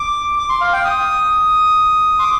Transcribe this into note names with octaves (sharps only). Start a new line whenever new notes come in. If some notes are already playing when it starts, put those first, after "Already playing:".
Already playing: D6
D6
C6
F5
G5
D#6
C6
D6